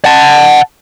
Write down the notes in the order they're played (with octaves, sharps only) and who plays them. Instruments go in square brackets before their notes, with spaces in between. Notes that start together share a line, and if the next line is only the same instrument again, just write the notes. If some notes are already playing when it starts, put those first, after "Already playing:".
[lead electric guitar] F#5 A5